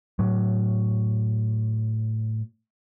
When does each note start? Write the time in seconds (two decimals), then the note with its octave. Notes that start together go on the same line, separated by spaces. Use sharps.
0.19 A2 F#3